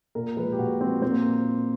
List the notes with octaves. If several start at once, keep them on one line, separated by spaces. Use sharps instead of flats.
A#2 A#4
F3 G#3 B4
G4
A#2 F#4
F3 G#3 C4
A#2 C4
A#3